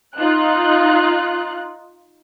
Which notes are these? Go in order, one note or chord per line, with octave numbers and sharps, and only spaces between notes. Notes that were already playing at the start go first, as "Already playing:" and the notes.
D#4 F4 F#6